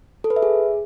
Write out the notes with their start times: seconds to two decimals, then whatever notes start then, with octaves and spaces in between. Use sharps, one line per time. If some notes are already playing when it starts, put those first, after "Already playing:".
0.24 A4
0.30 B4
0.36 E5
0.42 G#4